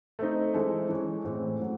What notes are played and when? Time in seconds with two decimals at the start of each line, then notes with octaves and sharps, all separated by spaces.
0.19 A3 C4 D#4
0.54 E3 G#3 C4 E4 A4
0.89 E3 G#3 C#4
1.25 A2 E3 G#3 C4
1.60 A2 F#3